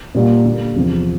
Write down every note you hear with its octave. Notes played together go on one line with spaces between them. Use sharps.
A#2 G3 A#3
D3 G3 A#3
E2 C3 F3